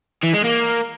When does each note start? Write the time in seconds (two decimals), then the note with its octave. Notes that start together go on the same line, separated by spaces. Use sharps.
0.24 E3
0.34 G#3
0.44 A#3